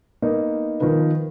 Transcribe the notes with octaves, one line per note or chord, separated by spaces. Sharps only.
A#3 B3 D#4
D#3 F3 B3 B4